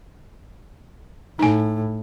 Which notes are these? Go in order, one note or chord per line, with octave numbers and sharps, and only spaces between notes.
A2 D#4 G#5